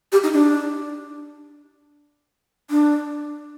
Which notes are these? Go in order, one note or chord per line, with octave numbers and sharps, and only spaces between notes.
G4
D#4
D4
D4